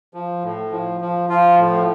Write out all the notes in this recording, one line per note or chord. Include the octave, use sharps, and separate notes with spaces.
F3
A2
F3
F3
F3 F4
A2